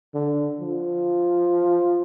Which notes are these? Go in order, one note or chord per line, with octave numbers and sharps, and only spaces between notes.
D3
F3